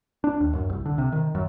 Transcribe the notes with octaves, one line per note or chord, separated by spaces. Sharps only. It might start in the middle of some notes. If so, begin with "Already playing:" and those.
D4
D#2
F#2
C2
D3
C3
D#3
F#2